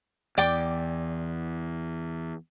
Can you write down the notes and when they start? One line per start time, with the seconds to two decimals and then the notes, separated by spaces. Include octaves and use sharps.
0.38 E2 D5 G5 D6